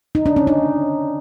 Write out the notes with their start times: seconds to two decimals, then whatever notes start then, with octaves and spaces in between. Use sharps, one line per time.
0.15 D#4
0.26 D4
0.36 C#4
0.47 D#4